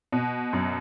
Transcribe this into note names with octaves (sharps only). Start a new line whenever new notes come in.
B2
F#2